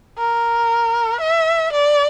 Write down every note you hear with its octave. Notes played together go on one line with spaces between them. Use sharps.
A#4
E5
D5